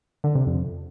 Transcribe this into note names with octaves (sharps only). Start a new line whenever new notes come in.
D3
C3
F2